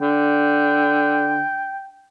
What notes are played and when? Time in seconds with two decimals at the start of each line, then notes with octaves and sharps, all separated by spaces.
0.01 D3 G5